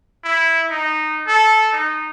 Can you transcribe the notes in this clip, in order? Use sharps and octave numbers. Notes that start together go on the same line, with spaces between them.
E4
D#4
A4
D#4